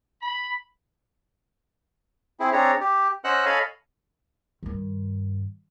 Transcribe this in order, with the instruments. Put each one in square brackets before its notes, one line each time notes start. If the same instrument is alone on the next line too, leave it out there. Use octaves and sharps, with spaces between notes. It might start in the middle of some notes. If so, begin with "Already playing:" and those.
[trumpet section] B5
[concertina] C4 E4 G#4
C4 D4 G#4 C#5 A#5
G4
C#4 C5 D#5 F#5 E6 F#6
A4 C#5 D#5 F5 G#5 B5
[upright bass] G2 D#3